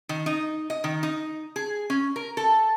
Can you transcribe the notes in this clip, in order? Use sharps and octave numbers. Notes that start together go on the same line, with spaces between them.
D#3
D#4
D#5
D#3
D#4
G#4
C#4
A#4
A4